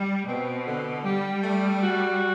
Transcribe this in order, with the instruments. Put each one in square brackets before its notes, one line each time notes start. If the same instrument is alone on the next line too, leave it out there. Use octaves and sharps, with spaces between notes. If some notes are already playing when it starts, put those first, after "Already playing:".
Already playing: [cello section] G3
[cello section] B2 [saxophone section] C4
[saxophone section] D3
[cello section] G3 [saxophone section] G4
[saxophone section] A3
F#4